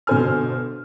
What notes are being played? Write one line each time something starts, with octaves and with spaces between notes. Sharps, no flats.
G1 B2 A4 C5 G#5 F6